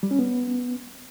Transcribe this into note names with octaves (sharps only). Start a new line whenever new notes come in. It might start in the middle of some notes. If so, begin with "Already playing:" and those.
G3
C#4
B3